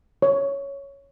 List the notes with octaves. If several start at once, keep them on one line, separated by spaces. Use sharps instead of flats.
C#5